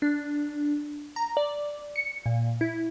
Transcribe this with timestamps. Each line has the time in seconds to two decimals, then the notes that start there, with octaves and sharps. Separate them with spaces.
0.02 D4
1.16 A#5
1.37 D5
1.96 C#7
2.26 A#2
2.61 E4